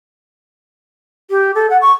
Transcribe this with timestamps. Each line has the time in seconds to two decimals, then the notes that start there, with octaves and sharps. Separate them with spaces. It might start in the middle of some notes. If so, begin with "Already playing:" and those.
1.30 G4
1.55 A4
1.70 F#5
1.81 C#6